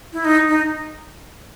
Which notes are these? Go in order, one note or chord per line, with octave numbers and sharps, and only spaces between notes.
E4
D#4
D#4